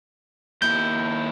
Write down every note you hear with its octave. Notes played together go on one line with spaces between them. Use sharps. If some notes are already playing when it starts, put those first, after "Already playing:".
D#2 E4 G6